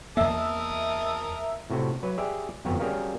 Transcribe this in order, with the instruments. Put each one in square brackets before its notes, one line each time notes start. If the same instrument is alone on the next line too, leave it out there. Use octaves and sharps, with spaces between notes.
[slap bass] E2 A#3 [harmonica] A#4 A5 D#6 [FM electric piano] D#5 E5 E6
[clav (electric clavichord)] A2 C3 F#4
F#3 B4
G4 G#4 D5 E5
G1 F2 B3 F#4 A#5
G3 C#4 F#4 G#4 A#4 F5